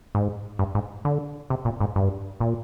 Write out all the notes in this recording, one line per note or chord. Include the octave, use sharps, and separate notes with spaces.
G#2
G2
G#2
D3
C3
A#2
G#2
G2
A#2